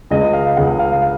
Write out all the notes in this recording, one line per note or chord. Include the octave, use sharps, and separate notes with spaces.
C#2 C#3 G#3 D#5
F5
C#2 C#3 G#3 F#5
F5
F5